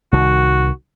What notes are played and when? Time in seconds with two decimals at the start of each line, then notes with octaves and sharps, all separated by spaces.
0.12 C2 D#3 F#4